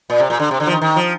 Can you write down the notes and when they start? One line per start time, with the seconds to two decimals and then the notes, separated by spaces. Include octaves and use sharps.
0.10 A#2
0.20 C3
0.30 A#2
0.40 D3
0.51 C3
0.60 D3
0.67 F3
0.70 D#3
0.81 D#3
0.96 F3